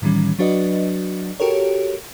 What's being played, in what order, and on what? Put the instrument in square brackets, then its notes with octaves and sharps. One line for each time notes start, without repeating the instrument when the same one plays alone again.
[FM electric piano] A2 D#3 E3 G3 C#4
F#3 D4 F#4 B4 D5 D#5
F#4 G4 A4 A#4 C#5